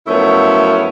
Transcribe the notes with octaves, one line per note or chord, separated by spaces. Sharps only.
F#2 F3 A3 B3 C#4 E4